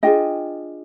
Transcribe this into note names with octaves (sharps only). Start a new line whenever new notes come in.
D4 F4 G#4 D#5 G5